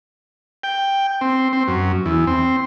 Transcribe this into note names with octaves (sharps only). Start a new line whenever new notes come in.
G5
C4
C4
F#2
E2
C4